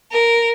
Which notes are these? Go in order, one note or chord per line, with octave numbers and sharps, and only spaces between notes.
A#4